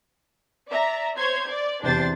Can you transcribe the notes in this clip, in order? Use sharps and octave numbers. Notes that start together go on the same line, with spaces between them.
D5 E5 A#5
C5 C#5 C6 G#6
D5
E2 C3 E3 D4 C5 A6